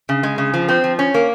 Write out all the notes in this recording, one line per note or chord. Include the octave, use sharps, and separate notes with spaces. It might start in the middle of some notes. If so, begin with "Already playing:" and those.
C#3
G#3
C#3
F3
C4
F3
C#4
A#3